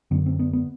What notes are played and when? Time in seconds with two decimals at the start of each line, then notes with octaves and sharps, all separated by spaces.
0.11 F#2 D3 B3
0.26 C4
0.39 B3
0.53 B3